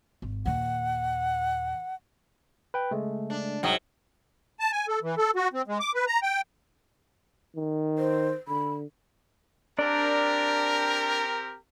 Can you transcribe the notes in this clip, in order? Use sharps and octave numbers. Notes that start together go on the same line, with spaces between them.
G#1
D#2 A#2 F#5
B4 G5
C#3 G#3 A3
D4
C2 G#2 F#3 G5 D#6
A5
G#5
A4
E3
A4
F#4
C4
G#3
D6
B4
A#5
G5
D#3
C5
D3 B5
C4 D4 G4 A#4 D5